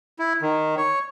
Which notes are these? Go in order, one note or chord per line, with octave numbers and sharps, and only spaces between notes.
E4
D#3
C#5